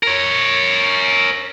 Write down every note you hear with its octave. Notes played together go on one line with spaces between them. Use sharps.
A#4 C#5